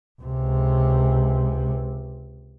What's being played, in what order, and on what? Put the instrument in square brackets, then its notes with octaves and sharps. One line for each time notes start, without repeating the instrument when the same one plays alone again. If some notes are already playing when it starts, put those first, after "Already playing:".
[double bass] C#2 C3